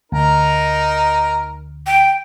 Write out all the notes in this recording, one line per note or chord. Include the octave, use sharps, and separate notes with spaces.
D2 D#4 A#4
G5